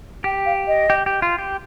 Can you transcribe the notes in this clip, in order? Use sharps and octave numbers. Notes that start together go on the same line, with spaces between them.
G4 G5
F5
D#5
G4
G4
F4
G4